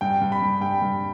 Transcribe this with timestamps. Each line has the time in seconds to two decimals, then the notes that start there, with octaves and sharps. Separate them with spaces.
0.01 G2 G5
0.21 G2
0.32 B5
0.42 G2
0.61 G2 G5
0.82 G2